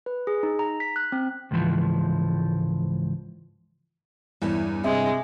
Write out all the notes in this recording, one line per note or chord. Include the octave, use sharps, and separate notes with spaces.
B4
G#4
D#4
A#5
B6
F#6
C4
C#2 G#2 E3 F3
E2 G2 E4 C#5
C3 G#3 E5